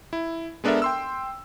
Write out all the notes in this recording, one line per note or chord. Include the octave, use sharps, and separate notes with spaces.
E4
G#3 B3 D4 A4 A#4 E5
G5 C6 E6